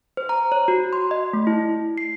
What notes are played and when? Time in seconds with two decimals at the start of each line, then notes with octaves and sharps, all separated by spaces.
0.17 C5
0.29 A#5
0.52 C#5
0.68 F#4
0.93 C6
1.11 D#5
1.33 A3
1.47 E4
1.98 C7